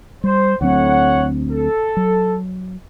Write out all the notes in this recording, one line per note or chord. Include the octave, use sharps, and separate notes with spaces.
G3 C5
D2 A2 F#3 C4 C#5 F#5
A4
F#3